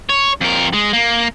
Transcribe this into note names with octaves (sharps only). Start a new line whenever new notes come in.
C#5
F2 A#4
G#3
A#3